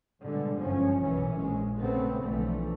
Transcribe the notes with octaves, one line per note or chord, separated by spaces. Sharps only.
B2 D3 G3 G#3
G1 F#2 F3 G#3 C#4
B1 F#2 A#2 E3 C#4
A#1 G#3
C#3 A3 B3 C4
B1 D3 E3 F3 A3